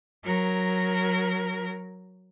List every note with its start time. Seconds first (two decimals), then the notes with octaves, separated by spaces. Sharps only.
0.25 F#3 A#4